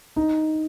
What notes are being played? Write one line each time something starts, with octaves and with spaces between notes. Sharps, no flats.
D#4